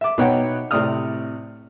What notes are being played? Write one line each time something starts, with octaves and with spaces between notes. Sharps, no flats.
E5 D6
B2 B3 D#4 C#5 F#5 G5
A2 C3 C4 D5 D#6 F6